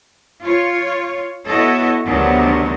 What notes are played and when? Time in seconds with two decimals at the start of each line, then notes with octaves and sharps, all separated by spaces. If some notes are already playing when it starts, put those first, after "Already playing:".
0.41 F4 C#5
1.46 B3 E4 F#4 A4 C#5 D#5
2.06 D2 C3 D#3 F#3 B3 D4